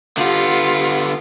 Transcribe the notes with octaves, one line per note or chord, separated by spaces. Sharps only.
D3 B3 F4 G4 F#5